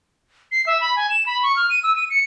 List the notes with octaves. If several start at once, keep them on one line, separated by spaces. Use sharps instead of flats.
C7
E5
B5
G#5
E7
B5
C#6
F6
D#7
E6
D#7
C#7